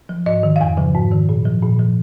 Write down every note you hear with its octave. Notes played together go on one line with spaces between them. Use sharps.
F3
G#2 D#5
D#3
F5
F2 G#5
C#3 F3
G#2
D#3
A#2
F3
A#2
F3